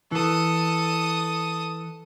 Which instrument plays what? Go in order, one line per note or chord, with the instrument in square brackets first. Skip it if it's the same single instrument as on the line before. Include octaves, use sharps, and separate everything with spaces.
[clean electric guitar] E3 [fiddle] A4 D#6